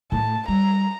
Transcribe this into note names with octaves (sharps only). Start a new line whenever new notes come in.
A2 A3 A5
G3 A#5